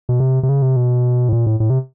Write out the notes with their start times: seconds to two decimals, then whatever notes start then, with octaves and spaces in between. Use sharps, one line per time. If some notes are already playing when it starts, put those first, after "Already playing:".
0.09 B2
0.20 C3
0.43 C3
0.49 C#3
0.62 C3
0.76 B2
1.29 A2
1.33 A#2
1.46 A2
1.60 A2
1.70 C3